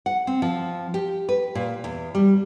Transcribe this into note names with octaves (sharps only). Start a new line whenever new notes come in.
F#5
C4
F3
G4
B4
A#2
E2
G3